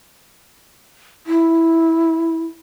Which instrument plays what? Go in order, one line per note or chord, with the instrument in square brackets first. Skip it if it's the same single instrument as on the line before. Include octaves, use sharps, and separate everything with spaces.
[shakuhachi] E4